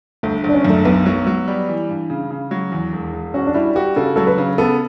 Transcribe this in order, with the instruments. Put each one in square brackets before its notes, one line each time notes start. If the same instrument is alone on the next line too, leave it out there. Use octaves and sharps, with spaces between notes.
[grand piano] G1 [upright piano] A3
[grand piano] G1
[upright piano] D4
C#4
[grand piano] F#2
[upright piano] A3
[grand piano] B1 [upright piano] B3
[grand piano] F#3
F#3
G3
E3
G2
C#3
C#3
F#3
E2
E1
E1
[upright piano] C#4 [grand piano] F#4
[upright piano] D4
[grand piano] G3 [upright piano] E4
[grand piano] F#4 [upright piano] G4
[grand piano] C#3 [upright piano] A4
[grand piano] F#3 [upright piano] A4
[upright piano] B4
[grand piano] C#3
[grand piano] B3 [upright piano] A4